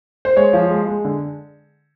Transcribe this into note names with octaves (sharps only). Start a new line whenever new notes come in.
C5
G#3 C#5
F3
G#3
G#3
D3